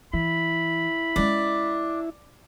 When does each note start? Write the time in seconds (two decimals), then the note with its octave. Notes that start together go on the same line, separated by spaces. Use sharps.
0.13 E3 E4 B5
1.16 G#3 C#4 D4